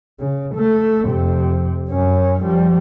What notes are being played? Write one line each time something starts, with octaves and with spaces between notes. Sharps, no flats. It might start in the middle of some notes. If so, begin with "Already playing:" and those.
C#3
A3
F2 C3
F#2 C#4
F3 G3